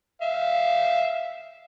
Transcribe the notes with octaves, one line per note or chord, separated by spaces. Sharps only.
E5 F5